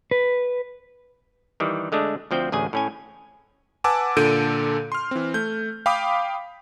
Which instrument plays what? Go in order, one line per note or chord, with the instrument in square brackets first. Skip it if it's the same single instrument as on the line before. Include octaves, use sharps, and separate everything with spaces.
[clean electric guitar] B4
[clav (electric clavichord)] D#3 E3 G3
D3 G#3 A3 D4
D2 F3 C4 G5
A1 D2 G#4 G#5
A2 C#4 G#5
[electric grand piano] B4 F#5 G#5 A5 D6 E6
A#2 D3 A4 G6 D7 D#7
C6 F6
E3 C4
A3 G6
F5 G5 B5 D6 D#6 B6